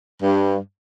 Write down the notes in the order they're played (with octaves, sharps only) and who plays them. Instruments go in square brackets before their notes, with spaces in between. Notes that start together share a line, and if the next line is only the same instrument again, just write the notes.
[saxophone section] G2